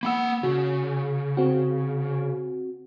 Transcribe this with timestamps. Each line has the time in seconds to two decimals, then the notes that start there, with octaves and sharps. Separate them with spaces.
0.03 A#3 F#5 B5 E6
0.43 C#3 F#4
1.37 C4 F#4